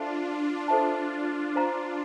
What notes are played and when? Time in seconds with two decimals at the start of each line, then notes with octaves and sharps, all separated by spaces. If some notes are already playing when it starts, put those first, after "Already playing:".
Already playing: D4 F4 A4 C5 E5 A5
0.68 A4 C5 E5 A5
1.56 C5 F5 A#5